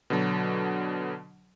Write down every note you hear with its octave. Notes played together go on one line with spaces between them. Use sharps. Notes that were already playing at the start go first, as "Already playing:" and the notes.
B2 D3 F#3